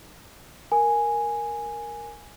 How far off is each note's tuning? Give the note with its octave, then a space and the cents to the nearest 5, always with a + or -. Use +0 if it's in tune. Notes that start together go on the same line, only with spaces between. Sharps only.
A#4 +0 G#5 +0